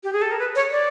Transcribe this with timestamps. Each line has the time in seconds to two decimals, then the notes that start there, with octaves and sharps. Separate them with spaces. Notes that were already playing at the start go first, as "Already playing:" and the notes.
0.04 G4
0.13 G#4
0.22 A4
0.31 A#4
0.39 B4
0.55 C#5
0.71 D5